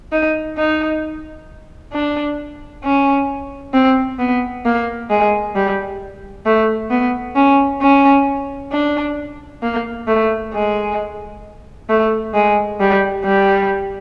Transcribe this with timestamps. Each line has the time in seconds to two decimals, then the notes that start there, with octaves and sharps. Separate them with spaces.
0.12 D#4
0.57 D#4
1.92 D4
2.84 C#4
3.74 C4
4.19 B3
4.65 A#3
5.10 G#3
5.55 G3
6.46 A3
6.91 B3
7.36 C#4
7.81 C#4
8.73 D4
9.63 A#3
10.08 A3
10.54 G#3
11.89 A3
12.34 G#3
12.80 G3
13.25 G3